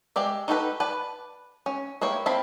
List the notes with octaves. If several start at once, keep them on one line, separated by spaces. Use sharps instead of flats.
G#3 G4 D5 E5
D#4 F#4 G4 A4 B4
B4 D5 A5
C#4
A#3 E4 G4 C#5
C4 E4 F5 A5 B5